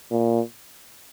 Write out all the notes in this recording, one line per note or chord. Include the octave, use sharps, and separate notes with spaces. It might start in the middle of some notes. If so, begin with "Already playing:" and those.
A#2